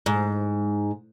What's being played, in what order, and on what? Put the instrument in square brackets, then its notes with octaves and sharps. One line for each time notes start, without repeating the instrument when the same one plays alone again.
[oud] G#2